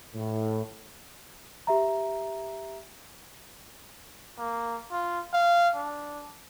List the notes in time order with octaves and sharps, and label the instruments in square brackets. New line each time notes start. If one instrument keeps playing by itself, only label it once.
[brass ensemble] A2
[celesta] G4 E5 A#5
[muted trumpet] A#3
F4
F5
D4